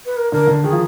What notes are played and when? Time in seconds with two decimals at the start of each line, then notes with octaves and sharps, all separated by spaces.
0.06 B4
0.17 A#4
0.32 D3 A#4
0.47 D3
0.63 D#3 G#4
0.72 F3